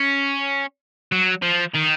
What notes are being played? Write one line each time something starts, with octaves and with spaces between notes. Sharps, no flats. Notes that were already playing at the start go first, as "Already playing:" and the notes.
Already playing: C#4
F#3
F3
D#3